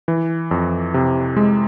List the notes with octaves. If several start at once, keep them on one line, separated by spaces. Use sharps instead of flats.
E3
F2
C3
G#3